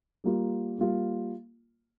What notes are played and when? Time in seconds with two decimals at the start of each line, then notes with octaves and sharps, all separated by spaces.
0.24 G3 A#3 F4
0.78 G3 A#3 F4